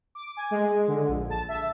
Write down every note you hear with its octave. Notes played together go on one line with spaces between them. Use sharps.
D6
G#5
G#3
D3
A#1
A5
E5